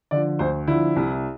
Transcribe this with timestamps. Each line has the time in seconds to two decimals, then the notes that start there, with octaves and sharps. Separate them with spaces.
0.11 D3 F3 D5
0.39 D2 C5
0.67 D3 F3 E4
0.96 C2